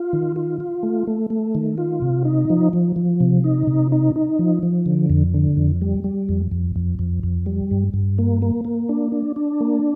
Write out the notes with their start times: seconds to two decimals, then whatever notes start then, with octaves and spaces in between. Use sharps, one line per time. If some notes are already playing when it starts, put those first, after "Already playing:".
Already playing: F4
0.13 D#3
0.36 F4
0.60 F4
0.83 A3
1.07 A3
1.30 A3
1.55 D#3
1.78 F4
2.02 C3
2.25 D#4
2.50 F3
2.73 F3
2.96 F3
3.20 C3
3.44 D#4
3.67 C3
3.92 D#4
4.16 D#4
4.39 F3
4.63 F3
4.86 D3
5.10 F2
5.34 D3
5.57 F2
5.82 G3
6.04 G3
6.29 F2
6.51 F2
6.76 F2
6.99 F2
7.23 F2
7.46 G3
7.71 G2
7.94 G2
8.18 A#3
8.42 A#3
8.65 A#3
8.89 D4
9.12 D4
9.36 D4
9.61 A#3